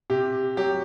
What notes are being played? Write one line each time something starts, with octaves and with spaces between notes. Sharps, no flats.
C3 G4
F#3 G4